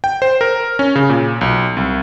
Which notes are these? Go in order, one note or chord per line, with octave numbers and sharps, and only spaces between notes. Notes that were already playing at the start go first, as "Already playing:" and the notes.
G5
C5
A#4
C#4
C#3
A#2
B1
C2